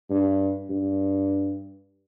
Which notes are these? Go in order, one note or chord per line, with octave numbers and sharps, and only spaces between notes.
G2
G2